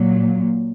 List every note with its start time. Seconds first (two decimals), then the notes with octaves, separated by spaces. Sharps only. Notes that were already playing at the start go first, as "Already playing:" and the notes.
Already playing: A#2 F#3